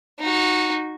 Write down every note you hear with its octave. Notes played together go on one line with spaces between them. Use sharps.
D#4 F#4